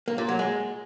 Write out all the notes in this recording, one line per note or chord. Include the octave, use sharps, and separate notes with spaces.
A#3
A#2
F#3
G#3